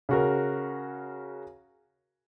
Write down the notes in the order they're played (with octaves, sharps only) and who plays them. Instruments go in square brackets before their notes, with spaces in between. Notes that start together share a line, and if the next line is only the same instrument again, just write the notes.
[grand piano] C#3 F#4 A#4